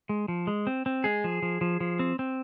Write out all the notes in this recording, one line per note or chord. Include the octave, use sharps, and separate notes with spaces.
G#3
F3
G#3
C4
C4
G#3 G#4
F3
F3
F3
F3
C4
C4